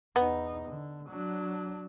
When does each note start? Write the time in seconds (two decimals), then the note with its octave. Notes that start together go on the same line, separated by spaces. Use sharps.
0.16 E2 B3 D#4
0.68 D3
1.09 F#3 D4